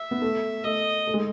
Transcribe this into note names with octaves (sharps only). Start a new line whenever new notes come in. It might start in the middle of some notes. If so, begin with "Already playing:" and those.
Already playing: E5
B3
A3
A3 D#5
A3
G#3